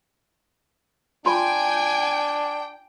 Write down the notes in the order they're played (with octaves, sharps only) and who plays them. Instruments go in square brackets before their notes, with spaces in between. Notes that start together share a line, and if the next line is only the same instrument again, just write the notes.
[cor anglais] D4 [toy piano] F4 B5 C6 [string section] G5 [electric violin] G#5